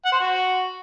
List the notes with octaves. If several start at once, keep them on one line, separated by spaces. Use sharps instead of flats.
F#5
C5
F#4